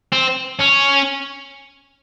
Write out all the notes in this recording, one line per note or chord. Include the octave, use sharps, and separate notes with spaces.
C4
C#4